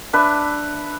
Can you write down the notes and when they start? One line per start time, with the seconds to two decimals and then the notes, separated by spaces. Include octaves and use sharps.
0.13 D4 B4 E5